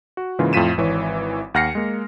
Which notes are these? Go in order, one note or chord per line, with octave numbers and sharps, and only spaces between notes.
F#4
G#2 C#3 E3 A#3 F4
F2 A2 F4 B6 D#7 E7
G#1 E3 C#5
D#2 F#5 F6 A#6 C7 C#7
G#3 A#3